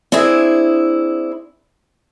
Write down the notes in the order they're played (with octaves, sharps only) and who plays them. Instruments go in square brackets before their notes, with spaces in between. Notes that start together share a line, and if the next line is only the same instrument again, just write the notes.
[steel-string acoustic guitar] C4 D4 E4 G#4 E5